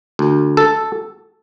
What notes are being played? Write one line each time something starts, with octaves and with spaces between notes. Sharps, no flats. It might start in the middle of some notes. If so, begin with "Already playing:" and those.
D2
A4